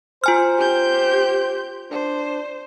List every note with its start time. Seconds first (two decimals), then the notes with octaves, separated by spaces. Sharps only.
0.24 F4 C5 G#5 F6
0.58 G4 G6
1.91 D4 C5